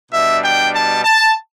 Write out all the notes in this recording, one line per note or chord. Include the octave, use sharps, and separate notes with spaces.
B2 G3 D4 E5
G5
A5
A5